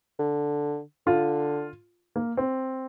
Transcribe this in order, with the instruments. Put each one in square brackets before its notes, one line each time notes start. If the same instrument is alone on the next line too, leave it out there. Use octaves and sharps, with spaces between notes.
[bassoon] D3
[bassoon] D3 [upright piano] F4
[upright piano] A#3
C4